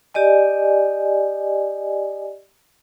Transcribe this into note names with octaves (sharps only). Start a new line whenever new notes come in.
G4 D5 D#5 G#5